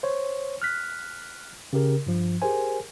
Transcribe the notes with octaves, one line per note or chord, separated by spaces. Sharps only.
C5 C#5
F6 F#6 B6
C#3 G4 A#4
G2 F3
G4 G#4 A#4 C5 G#5